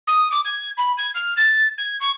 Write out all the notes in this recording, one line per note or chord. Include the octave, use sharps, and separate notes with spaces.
D#6
D6
G#6
B5
G#6
F6
A6
G#6
C#6